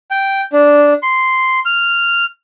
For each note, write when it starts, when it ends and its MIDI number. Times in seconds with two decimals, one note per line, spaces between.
0.11 0.41 79
0.53 0.93 62
1.03 1.60 84
1.65 2.25 89